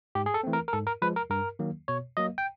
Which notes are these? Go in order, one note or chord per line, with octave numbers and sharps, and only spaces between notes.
G#2 G4
G#4
A4
E3 A3 C4
A#4
A#4
G#2 A4
A#4
F3 G#3 B4
A#4
G2 A#4
D#3 F#3 A#3
B2 C#5
F#3 A#3 D#5
G5